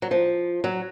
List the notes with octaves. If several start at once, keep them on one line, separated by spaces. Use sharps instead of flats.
F#3
F3
F#3